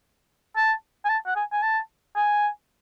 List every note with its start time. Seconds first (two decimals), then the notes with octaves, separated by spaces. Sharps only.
0.56 A5
1.05 G#5
1.09 A5
1.26 F#5
1.36 G#5
1.52 G#5
1.62 A5
2.16 G#5